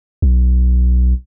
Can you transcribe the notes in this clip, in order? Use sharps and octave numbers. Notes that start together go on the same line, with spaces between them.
B1